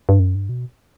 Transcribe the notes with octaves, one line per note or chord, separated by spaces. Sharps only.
G2
F#2
G2
B2